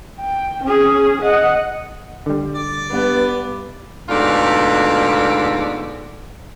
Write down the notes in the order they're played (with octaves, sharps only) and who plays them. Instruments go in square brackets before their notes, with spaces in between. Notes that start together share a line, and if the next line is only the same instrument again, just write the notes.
[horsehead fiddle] G5
C#4 G#4
D#5 F#5
[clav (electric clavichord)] D3 G3
[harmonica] D5
[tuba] G2 [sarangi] B3
[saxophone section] D2 G#2 B2 F4 A4 D5